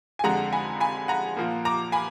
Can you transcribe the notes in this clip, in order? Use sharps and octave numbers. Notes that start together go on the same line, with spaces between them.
G#5
F2 D3 G#3 F#5 A#5
G#5 B5
G#5 B5
F#5 A#5
A#2 F3 A#3
A#5 D6
G#5 B5